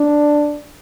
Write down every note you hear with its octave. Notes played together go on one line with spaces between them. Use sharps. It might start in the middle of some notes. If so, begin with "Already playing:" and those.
Already playing: D4